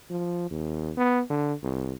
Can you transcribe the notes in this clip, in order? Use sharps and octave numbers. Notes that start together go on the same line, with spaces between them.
F3
D#2
B3
D3
C2